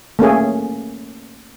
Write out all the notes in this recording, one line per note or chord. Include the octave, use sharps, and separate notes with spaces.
A3 A#3 C#4 G#4